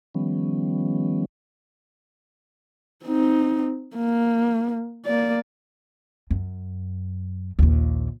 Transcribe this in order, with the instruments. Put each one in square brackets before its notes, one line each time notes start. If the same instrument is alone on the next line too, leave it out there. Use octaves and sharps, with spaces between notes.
[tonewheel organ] D#3 F3 G3 B3 C#4
[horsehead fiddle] C4 D#4
A#3
A#3 D5
[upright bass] F#2
A#1 D#2